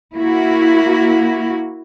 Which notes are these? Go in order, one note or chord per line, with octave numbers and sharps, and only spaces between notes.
A#3 E4 F#4